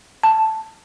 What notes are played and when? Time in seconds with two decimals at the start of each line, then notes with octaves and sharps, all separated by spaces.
0.23 A5